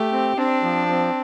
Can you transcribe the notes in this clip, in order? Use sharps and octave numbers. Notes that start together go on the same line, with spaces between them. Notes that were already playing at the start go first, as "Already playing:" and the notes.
Already playing: A3 G4
C4
C4 D4
F3
C4